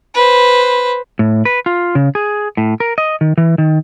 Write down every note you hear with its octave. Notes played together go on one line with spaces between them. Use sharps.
B4 C5
A2
B4
F4
C#3
G#4
A2
A#4
D#5
D#3
E3
D#3